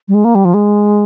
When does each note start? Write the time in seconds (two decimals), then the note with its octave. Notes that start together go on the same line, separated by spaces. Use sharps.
0.08 G3
0.14 G#3
0.25 A#3
0.35 G3
0.45 F3
0.54 G#3